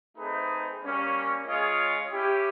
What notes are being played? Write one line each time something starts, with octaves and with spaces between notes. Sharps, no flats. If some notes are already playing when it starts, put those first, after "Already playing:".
A3 C4 D#4 G#4 B4
G3 A#3 C#4
G#3 C#4 F4 G#4 C#5
C#4 E4 G4